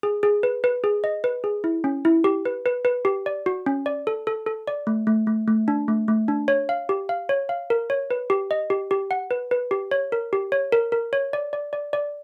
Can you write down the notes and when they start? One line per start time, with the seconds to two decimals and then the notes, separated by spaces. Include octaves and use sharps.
0.03 G#4
0.23 G#4
0.43 B4
0.64 B4
0.84 G#4
1.04 D#5
1.24 B4
1.44 G#4
1.64 E4
1.84 C#4
2.05 E4
2.24 G4
2.45 B4
2.66 B4
2.85 B4
3.05 G4
3.26 D5
3.46 F#4
3.66 C#4
3.86 D5
4.07 A4
4.27 A4
4.47 A4
4.68 D5
4.87 A3
5.07 A3
5.27 A3
5.48 A3
5.68 D4
5.88 A3
6.08 A3
6.28 D4
6.48 C#5
6.69 F5
6.89 G4
7.09 F5
7.29 C#5
7.49 F5
7.70 A#4
7.90 C#5
8.10 B4
8.30 G4
8.51 D#5
8.70 G4
8.91 G4
9.11 F#5
9.31 B4
9.51 B4
9.71 G4
9.91 C#5
10.12 A#4
10.33 G4
10.52 C#5
10.72 A#4
10.92 A#4
11.13 C#5
11.33 D5
11.53 D5
11.73 D5
11.93 D5